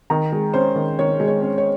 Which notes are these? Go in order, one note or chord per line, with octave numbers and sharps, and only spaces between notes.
D#3 A#5
G#3
C#4 C5
D#3
D#3 C#5
G#3
C#5
C#4
C#5